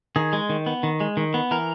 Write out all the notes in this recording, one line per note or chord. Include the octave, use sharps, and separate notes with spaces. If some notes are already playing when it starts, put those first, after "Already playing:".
D#3 G#4
G#3
D#3
B3
D#3
G#3
D#3
B3
E3 A#4